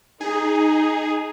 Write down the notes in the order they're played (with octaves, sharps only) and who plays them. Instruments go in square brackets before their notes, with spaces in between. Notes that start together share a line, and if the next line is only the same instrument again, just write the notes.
[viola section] D#4 [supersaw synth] G#4